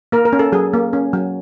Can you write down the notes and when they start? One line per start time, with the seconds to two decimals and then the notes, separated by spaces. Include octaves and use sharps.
0.12 A#3 A#4
0.25 A#4
0.33 C#4
0.39 A4
0.52 F#3 G#4
0.74 A#3
0.93 C#4
1.13 F#3